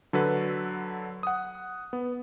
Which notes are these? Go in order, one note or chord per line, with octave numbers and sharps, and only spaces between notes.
D3 F#3 A4 B4
F#5 D#6
B3